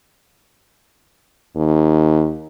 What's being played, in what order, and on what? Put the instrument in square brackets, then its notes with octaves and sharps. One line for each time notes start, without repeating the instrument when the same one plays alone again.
[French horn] D#2